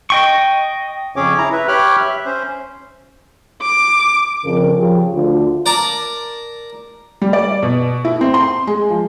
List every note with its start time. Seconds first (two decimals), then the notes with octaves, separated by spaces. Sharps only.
0.10 D#5 G5 C#6
1.16 F2 C#3 C#4 G#4 C#5 D6
1.38 E4 A#5
1.53 B4 E5
1.68 G4 C#5 G5 B5 F6 F#6
2.00 E5
2.26 C#4 C5
3.62 D6
4.44 F2 C#3 A#4
4.78 C#3 F3 G4
5.13 D2 F4
5.66 A#4 D5 A5 A#5
7.22 G3
7.33 D5
7.62 B2
8.05 E4
8.21 C4
8.34 C6
8.67 G#3
8.90 F3